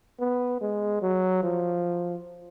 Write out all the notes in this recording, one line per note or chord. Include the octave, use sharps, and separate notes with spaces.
B3
G#3
F#3
F3